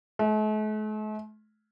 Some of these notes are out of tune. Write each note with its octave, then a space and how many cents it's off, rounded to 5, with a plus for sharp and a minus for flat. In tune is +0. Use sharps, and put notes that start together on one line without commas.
A3 -45